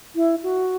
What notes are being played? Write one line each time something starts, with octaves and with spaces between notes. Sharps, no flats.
E4
F#4